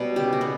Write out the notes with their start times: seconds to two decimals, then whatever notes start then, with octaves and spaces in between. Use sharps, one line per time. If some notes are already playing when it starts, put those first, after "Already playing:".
Already playing: B2 G3 B4 C#5
0.16 C#3 G4
0.33 F#4
0.41 B3